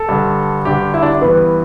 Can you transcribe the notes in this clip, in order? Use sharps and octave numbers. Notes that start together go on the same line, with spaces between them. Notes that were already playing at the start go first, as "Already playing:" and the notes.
Already playing: A4
G2 D3
G2 D3 G4
E4
D4
G2 E3 B3